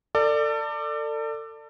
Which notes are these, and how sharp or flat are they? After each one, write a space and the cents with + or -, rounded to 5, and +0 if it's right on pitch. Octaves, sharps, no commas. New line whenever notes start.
A4 +35 D5 +15